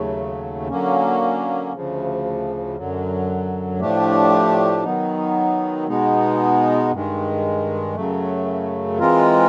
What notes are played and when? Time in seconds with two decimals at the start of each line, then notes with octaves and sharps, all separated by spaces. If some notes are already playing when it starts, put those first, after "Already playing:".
Already playing: D#2 C#3 F#3 A3
0.69 D3 F#3 A#3 C#4
1.73 D2 C#3 F3
2.77 F#2 D3 F#3
3.79 A2 F3 A3 D4 G4
4.83 D#3 F#3 B3 D#4
5.88 B2 G#3 B3 D#4
6.91 G2 D#3 G#3
7.95 F#2 C#3 F#3 A3
8.99 E3 G#3 C4 F4 A#4